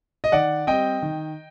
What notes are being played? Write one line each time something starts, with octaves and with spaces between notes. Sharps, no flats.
D#5
D#3 D5 F#5
G3 C4 D#5 G5
D#3